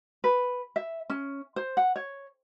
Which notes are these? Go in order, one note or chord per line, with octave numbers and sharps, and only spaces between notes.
B4
E5
C#4
C5
F#5
C#5